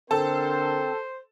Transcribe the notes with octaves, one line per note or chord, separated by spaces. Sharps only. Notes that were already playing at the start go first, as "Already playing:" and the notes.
D3 C4 A4 A#4 C5 A5